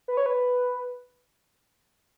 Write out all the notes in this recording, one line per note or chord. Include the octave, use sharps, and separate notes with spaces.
B4
C#5
B4